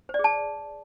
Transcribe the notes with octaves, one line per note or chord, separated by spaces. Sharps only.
C5
D5
G#4
A5